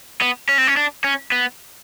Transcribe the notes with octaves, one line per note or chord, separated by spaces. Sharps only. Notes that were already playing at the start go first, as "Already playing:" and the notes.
B3
C#4
C4
C#4
D4
C#4
B3